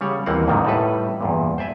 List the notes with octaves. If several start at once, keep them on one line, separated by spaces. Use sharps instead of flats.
C#3 G3 C#5 F#5
D#2 E3 A#3 C4 F#5
F2 G#2 C3 D#3 F3 G3
A2 G3 D#4 A4 B4
E2 G2 A#2
C5 D5 E5 G#5